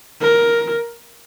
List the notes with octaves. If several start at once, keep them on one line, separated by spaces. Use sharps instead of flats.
A#4